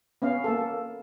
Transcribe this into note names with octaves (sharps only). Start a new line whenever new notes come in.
B3 C#4 F5
A#3 A4